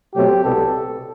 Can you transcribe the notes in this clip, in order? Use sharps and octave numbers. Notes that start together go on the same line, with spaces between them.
B2 F#3 A3 C4 G4
C2 B2 G3 B3 A4